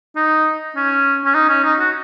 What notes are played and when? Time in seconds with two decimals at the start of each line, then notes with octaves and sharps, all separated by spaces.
0.16 D#4
0.76 C#4
1.25 C#4
1.35 D#4
1.49 C#4
1.64 D#4
1.79 F#4